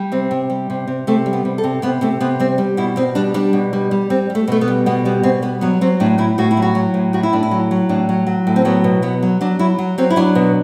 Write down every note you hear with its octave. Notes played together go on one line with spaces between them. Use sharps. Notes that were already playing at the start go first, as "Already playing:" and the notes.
Already playing: G3
C3 C4
C3
G3
C3
C3
C3 A3
G3
B3
C3
A4
C3
C3 B3
C3 A3
C3 B3
G3 C4
G3
B2 E4
B2 C4
G3 D4
G3 D4
B2
G3
G3
G3 C4
G3
A3
B2 A3
B3
G3
B2 B3
G3 B3
B2 C4
G3 B3
F#3 B3
F#3 C4
A2 D4
A2 E4
A2 F#4
E4
F#3
F#4
F#3
A2
A2 F#4
E4
A2 D4
E4
F#3
F#3
A2 D4
F#3
F#3
A2
C4
F#3 B3
B2
F#3 B3
F#3
F#3 D4
F#3 E4
F#3
F#3 C4
E4
F#3 D4
B2